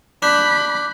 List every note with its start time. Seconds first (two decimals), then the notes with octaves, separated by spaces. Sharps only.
0.22 D4 B5 D6 F#6 G6 B6